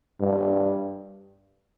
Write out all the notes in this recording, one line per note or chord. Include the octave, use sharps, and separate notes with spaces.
G2